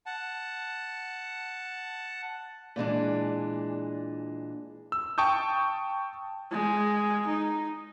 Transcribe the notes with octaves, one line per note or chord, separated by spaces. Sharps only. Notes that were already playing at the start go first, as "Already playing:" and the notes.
F#5 A5
A#2 E3 G#3 D4
E6
G5 A5 C#6 D#6 G6
G#3
D#4